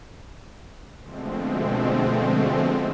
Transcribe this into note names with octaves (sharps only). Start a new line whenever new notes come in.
B2 D3 F3 G#3 A3 C4